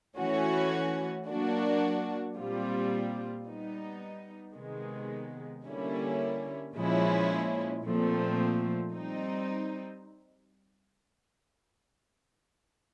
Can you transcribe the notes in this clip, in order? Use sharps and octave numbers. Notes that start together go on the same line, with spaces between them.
E3 A3 C#4 F#4
F#3 A#3 D4 F#4
A#2 G3 C4 F4
G3 B3 D#4
C3 D#3 G#3 B3
D3 G3 A#3 C#4 E4
A#2 F3 G#3 C#4 E4
A#2 F3 A3 C4
G3 C4 D#4